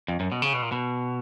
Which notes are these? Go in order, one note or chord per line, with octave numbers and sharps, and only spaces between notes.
F2
F#2
B2
C#3
B2
A#2
B2